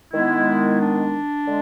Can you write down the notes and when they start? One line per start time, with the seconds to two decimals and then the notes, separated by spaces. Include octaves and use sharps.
0.13 D#3 G#3 B3 E4
0.80 D4
1.46 D3 G#3